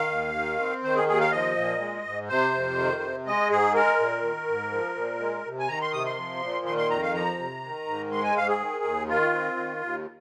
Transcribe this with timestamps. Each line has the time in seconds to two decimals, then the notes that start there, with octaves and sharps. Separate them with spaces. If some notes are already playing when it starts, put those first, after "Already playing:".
Already playing: D#3 F5
0.10 D#2
0.34 D#3
0.60 C4
0.83 D#3 C5
0.96 G#4
1.07 D#2 G#4
1.20 F5
1.32 F3 D#5
1.56 A#2
1.80 G#3
2.05 G#2
2.28 C3 C5
2.53 F2
2.77 D#3
3.01 C3
3.26 G#3 D#5
3.50 G#2 G#4
3.74 G#3 A#4
3.99 A#2
4.23 D#3
4.48 G#2
4.71 F3
4.96 A#2
5.20 G#3
5.45 C3
5.59 G#5
5.68 D#3 A#5
5.81 C6
5.92 C3 D#6
6.06 C6
6.17 F3
6.41 A#2
6.66 D#3 C6
6.78 C6
6.90 F2 A#5
7.02 F5
7.14 F3 A#5
7.38 C3
7.63 D#3
7.87 G#2
8.11 G#3 C6
8.24 G#5
8.35 G#2 F5
8.48 G#4
8.59 D#3
8.84 D#2
9.08 D#3 F4
9.33 C4
9.56 D#3
9.81 D#2